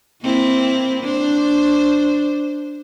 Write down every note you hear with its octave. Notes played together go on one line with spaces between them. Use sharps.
A#3 C4 E4
D4 C5